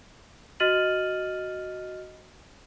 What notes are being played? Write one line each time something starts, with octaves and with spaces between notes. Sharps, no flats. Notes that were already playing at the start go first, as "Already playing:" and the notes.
F#4 D#5 F6 A6 D#7 F#7